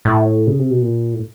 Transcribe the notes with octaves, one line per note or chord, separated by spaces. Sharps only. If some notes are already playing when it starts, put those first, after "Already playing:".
A2
C#3
C3
B2
A#2
A2